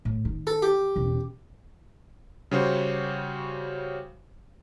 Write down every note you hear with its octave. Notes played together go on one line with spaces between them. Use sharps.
A2
D#3
A4
G4
E1 C#3
C#3 G3 C#4 F#4 C5